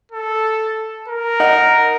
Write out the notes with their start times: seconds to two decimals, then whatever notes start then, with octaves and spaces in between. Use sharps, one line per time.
0.12 A4
1.08 A#4
1.40 D#4 F#5 F#6